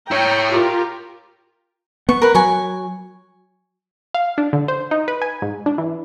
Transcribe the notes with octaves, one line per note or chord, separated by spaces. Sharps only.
E4 C#5 G5 A#5
F4 G4 A#4
B3 C#6
A#4 B4
F#3 G#5 C#6
F5
D4
D3
C5
D#4
B4
G#5
G#2
D4
E3